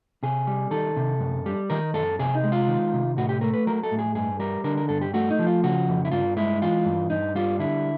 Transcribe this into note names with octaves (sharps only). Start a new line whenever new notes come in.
C3 G#4
G3
D#3 A4
C3
F#2
G3
D#3 A#4
F#2 A4
C3 G#4
D#4
G#3
F4
D#3
C3
A2 F#4
G4
A3 A#4
B4
F#3 A#4
A4
A2
G#4
G2 G#4
G3 A#4
D3 A#4
A#4
G2 A4
G4
A3 F#4
D#4
F3
F4
C#3 F#4
F2
E4
G2 F4
G#3 E4
E3 F4
G2
G2 D#4
G3 F4
D3 E4